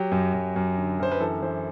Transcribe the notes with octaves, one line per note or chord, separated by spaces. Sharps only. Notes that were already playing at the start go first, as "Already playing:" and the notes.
Already playing: F#3 G4
F#2
F#2
F#2
D3
F#2 C5
B4
E3 A4
E3 C5